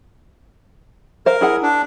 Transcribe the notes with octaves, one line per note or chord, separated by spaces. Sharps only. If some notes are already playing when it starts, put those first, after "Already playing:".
A#4 C5 F5
E4 G#4 F#5
D4